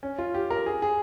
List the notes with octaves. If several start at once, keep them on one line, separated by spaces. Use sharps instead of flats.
C#4
F4
G4
A#4
G#4
G#4